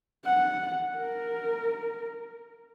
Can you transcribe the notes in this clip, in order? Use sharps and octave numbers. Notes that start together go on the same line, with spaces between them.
F#5
A#4